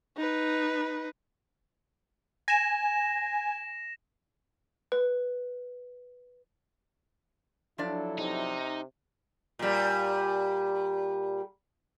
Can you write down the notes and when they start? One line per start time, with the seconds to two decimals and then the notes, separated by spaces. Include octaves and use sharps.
0.17 D#4 B4
2.48 G#5 A#6 E7
4.92 B4
7.78 F3 F#3 D4 E4 A4 D5
8.19 C3 D#4
9.59 A#2 G3